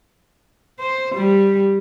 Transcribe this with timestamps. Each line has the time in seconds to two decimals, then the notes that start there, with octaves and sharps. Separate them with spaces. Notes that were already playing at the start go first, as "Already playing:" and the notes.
0.79 C5
1.16 G3